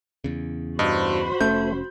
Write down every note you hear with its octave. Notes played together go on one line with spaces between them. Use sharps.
E2 C#3
G2 F#4 C5 D#5 B5
F1 A3 C#4 G6